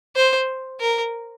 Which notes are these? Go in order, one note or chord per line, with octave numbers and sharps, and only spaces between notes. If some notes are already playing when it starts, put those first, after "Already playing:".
C5
A#4